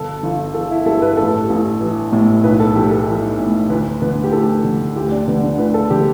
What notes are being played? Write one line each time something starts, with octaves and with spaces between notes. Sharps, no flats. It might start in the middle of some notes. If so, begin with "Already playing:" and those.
Already playing: G1 B2 A4
G1
E3 A4
E4
G2 A4
B4
A1 A4
A1
E3
A2
B1 B4
A4
B1 G4
A4
E3
A2
D2 B4
D3 B4
G4
D2 A4
D3
D2 G4
D4
D3 B3
D4
D2 B4
A4
D3 G4